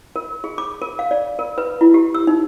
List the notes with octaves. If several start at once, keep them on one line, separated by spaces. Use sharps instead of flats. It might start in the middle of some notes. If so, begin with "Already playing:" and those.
A#4
G#4
D6
A#4
F5
D5
A#4
B4
E4
G4
E6
D#4